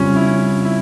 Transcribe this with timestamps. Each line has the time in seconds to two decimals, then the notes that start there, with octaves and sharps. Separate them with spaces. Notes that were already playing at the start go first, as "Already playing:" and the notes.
Already playing: F2 C#3 G3 C4 C#4 F4
0.16 E4
0.27 C#4
0.65 E4